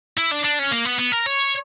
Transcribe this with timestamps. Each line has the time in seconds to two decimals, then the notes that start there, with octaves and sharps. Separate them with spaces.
0.17 E4
0.31 D4
0.44 D4
0.59 C#4
0.71 A#3
0.85 B3
0.99 B3
1.12 A#4
1.26 C#5